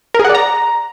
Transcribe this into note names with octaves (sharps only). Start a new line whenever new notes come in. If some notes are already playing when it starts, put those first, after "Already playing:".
A#4
G#4
F#5
D5
A#5